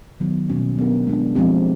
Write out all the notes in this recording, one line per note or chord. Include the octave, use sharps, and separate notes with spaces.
D#3 F#3 B3 D#4
B2 G3 A#3 C#4 F#4
F#3 B3 D4 G4 A#4
G#3 B3 D4
F3 G#3 C4 D#4 G4